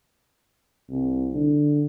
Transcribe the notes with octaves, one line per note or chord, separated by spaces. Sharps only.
C2
D3